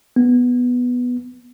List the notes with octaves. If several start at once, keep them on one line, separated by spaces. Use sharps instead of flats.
B3